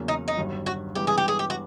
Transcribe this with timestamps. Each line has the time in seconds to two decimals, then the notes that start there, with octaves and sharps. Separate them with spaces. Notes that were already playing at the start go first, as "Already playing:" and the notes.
Already playing: E2 C#3 F#3 A#3 C#4
0.08 D#4
0.28 D#4
0.37 G1 G2 D#3 F#3
0.66 F#4
0.95 G2 E3 G#3 B3 G4
1.07 G#4
1.18 G4
1.28 G#4
1.39 G4
1.50 F#4